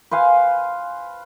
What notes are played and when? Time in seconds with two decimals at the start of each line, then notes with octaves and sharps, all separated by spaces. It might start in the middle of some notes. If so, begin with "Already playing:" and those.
0.11 B4 C5 F5 G#5